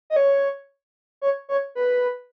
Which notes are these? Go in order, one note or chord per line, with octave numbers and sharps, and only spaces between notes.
D#5
C#5
C#5
C#5
B4